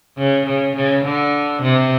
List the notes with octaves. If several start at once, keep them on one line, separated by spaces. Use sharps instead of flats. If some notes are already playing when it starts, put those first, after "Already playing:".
C#3
C#3
C#3
D3
C3